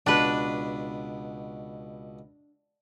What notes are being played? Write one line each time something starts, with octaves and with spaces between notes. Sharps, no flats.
C#2 B2 D4 B4